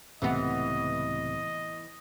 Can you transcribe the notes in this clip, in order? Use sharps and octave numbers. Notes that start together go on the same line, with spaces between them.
C#2 A2 C3 E3 B3 D#5